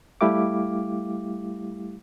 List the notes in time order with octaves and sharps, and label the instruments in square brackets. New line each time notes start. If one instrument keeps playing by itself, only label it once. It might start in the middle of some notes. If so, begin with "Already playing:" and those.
[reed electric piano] G3 A3 E4 G4 F5 D6